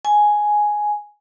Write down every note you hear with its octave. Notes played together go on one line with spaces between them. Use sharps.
G#5